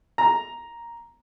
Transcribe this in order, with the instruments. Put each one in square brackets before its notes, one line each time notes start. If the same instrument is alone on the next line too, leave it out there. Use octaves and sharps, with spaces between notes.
[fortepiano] A#5